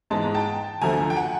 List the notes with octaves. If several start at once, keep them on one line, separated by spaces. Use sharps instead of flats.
G#2 E3 G#3 A5
A#5
G5 A5
D2 D3 F3 A3 G#5 A#5
G5
F#5 G#5